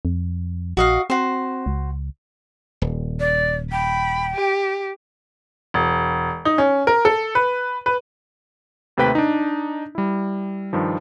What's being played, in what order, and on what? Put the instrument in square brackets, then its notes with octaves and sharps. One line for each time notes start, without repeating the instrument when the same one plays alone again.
[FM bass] F2
[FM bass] A#1 [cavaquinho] F#4 D#5 F5
[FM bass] C4 [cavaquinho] F#4 C5
[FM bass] C#2
[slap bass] D#1
[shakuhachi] D5
[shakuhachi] G5 [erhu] B5
[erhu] G4
[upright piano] E1
D#4
C#4
A#4
A4
B4
B4
[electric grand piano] D#2 C3 A3 B4 G5 B6
D4 D#4
G3 E4
G2 D#3 F3